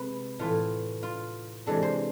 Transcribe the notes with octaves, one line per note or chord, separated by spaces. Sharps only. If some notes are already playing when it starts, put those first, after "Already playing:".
Already playing: C3 G#3 B4
A2 E3 A3 F4
F4
C3 E3 G#3 D4 A4
C5